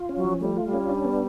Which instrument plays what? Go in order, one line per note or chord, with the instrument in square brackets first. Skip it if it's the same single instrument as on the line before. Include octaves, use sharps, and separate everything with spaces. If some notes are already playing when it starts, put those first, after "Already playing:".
Already playing: [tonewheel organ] F4
C#4
[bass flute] F#3
[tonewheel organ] F3
[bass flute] G3 [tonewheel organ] A3
[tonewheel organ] F4
[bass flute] G3
[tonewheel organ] C#4
D4
B3